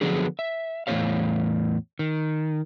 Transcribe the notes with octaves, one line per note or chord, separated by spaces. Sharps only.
D3 F3 F#3 B3 D4 G#4
E5
E2 A2 A#3 C5 C#5 F5
D#3